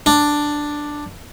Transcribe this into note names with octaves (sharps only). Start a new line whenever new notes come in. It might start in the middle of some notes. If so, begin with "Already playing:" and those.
D4